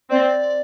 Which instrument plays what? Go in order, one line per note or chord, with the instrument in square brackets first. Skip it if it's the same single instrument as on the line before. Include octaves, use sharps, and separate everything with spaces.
[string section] C4 [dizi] D5